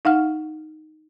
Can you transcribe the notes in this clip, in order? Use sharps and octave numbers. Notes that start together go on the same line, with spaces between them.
D#4 F5 F#5 F6